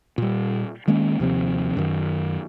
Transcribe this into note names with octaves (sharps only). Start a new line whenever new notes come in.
A#2 G3
D#3 G#3 A#3 C#4
D#2 C3 F3 C4
F#2 D#3